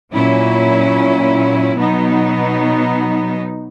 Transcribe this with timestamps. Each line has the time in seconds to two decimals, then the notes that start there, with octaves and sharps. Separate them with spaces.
0.14 A#2 F#3 C#4 E4
1.76 B2 F#3 B3 D#4